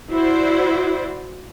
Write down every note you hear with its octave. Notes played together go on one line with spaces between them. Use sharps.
E4 F#4 C5 D5